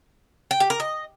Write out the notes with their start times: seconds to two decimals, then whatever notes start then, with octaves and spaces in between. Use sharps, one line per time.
0.51 G5
0.60 G4
0.70 A#4
0.80 D#5